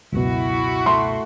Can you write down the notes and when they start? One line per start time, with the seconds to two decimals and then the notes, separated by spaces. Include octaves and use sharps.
0.12 C#2 F#2 B2 E4 F#4
0.86 A3 C6